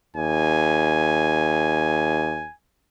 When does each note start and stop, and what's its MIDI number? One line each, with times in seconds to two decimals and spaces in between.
0.16 2.47 39
0.16 2.54 80